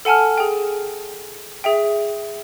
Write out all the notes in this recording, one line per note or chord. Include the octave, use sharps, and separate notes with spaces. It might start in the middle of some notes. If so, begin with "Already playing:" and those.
A4 F#5 G#5 A5 F6
G#4 G5
G#4 E5 G5